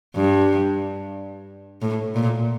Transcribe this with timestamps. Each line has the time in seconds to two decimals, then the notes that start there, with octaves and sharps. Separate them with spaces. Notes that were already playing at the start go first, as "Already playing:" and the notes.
0.16 G2
1.82 A2
2.15 A#2